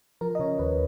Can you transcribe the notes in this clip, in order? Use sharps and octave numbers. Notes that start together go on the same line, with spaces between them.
F3 A#4
D#5
C#3 C#5
D#2 B4